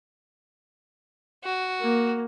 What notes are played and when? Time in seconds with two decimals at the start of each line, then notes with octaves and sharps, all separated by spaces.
1.44 F#4
1.81 A#3